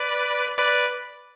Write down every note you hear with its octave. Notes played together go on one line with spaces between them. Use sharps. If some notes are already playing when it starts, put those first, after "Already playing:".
Already playing: B4 D5
B4 D5